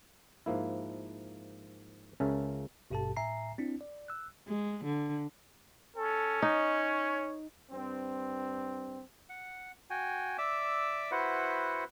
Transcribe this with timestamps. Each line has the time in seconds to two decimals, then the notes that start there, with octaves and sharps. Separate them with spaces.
0.46 G#2 F3 A#3 E4
2.20 C#2 C#3 C#4 A#4 E5 A5
2.90 G#1 G2 B2 G4 A4 A5
3.16 A2 E5 G#5 A#5 C7
3.58 C4 D4 E4
3.81 D5
4.08 E6 F#6
4.48 G#3
4.85 D3
5.97 C#4 A4
6.42 D#4 C#5
7.71 G2 C4
9.29 F#5
9.90 F#4 G5 G#5
10.38 D5 E5 D6 E6
11.11 E4 F#4 B4 C5 F#5